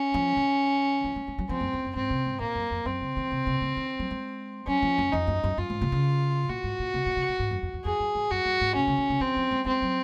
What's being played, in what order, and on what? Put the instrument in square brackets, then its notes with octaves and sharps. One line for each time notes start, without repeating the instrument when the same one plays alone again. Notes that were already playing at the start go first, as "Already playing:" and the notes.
Already playing: [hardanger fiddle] C#4
[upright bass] F3
D#3
F3
G#3
G#3
F#3
[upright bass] F3 [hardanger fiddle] C4
[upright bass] F#2
F2
F#2
[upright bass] G#2 [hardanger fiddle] C4
[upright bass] C3
G#2
[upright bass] A#2 [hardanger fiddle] A#3
[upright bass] F#2
F2
[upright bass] F#2 [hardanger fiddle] C4
[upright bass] C#3
D#3
C3
C3
C#3
D#3
F#3
G#3
[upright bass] F#3 [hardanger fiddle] C#4
[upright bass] F3
F#2
[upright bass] F2 [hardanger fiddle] D#4
[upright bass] F#2
F#2
[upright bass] F#2 [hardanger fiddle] F4
[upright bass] G#2
C3
C#3
[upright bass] A#2 [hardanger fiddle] F#4
[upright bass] G#2
A#2
C3
A#2
C3
A#2
G#2
F#2
F2
F2
[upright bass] F2 [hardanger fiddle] G#4
[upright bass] F#2
G#2
[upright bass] F#2 [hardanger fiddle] F#4
[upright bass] F#2
G#2
[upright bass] C3 [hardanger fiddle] C#4
[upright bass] C#3
D#3
C#3
[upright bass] D#3 [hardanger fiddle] C4
[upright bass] F3
G#3
[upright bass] G#3 [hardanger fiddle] C4
[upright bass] F#3